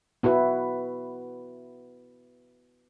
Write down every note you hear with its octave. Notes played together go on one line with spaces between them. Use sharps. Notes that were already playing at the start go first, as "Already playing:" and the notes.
B3 E4 F#4 B4